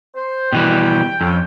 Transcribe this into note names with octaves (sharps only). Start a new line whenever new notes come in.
C5
B2 E3 G3 G5
F2 C#4 A4 G5